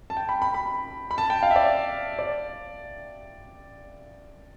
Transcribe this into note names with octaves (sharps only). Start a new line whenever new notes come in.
A5
G5
B5
B5
B5
B5
A5
G5
F5
E5
D5
D5